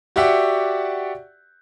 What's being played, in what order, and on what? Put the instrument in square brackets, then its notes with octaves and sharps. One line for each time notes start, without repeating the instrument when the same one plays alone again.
[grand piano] F#4 G4 D5 E5 F#5